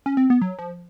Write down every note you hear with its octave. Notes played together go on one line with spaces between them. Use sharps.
C#4
C4
B3
F#3
F3